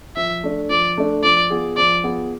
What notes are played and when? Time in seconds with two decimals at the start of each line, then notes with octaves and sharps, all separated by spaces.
0.16 F3 E5
0.43 A3 D4
0.70 F3 D5
0.98 A3 D4
1.23 F3 D5
1.50 B3 F4 G#4
1.77 F3 D5
2.04 B3 F4 G#4